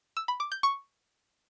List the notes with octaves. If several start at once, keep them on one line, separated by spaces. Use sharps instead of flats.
E6
B5
D6
G6
C#6